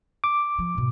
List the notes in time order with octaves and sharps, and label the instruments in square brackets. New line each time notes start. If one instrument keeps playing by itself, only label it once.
[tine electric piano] D6
[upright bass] F3
G#2 B2